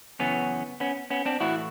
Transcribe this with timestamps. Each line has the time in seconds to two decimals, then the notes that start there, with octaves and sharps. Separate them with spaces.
0.19 F#2 C#3 E3 B3 C#4
0.80 B3 C#4
1.10 B3 C#4
1.26 C4 D4
1.40 A2 E3 E4 F#4